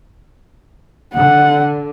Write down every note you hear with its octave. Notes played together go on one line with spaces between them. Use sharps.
D3 F#5